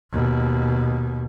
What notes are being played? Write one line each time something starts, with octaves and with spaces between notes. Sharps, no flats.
D#2 B2